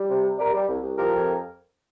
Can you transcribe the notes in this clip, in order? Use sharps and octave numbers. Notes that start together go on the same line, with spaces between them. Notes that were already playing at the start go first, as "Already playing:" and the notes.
Already playing: G3
C3
C3
G3 A#4 D5
G3
C2
C2
F3 G4 A#4
F2